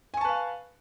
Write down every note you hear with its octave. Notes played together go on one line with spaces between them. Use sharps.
B4 F5 G#5 A5 C#6